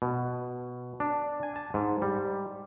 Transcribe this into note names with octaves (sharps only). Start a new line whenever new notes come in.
B2
D4
G#5
A5
G#2
G3